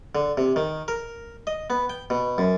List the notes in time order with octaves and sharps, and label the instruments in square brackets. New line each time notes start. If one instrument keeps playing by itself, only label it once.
[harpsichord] D3
C3
D#3
A#4
D#5
B3
G5
B2
F#2